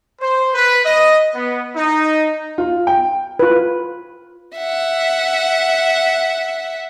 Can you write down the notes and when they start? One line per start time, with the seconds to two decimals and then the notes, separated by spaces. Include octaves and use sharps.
0.20 C5
0.54 B4
0.83 D#5
1.34 B3
1.75 D#4
2.58 F4
2.87 G5
3.39 F4 B4
4.58 E5 F#5